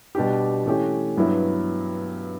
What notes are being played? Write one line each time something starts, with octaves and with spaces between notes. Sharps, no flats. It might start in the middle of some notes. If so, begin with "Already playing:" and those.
B2 G3 D4 G4
E3 A3 C#4 G4
G2 F#3 B3 E4